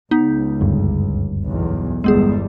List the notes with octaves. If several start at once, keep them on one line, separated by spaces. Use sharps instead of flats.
C#2 B3 D#4
F#1 D2 G2
B1 E2
G1 E2 G3 G#3 B3 G#4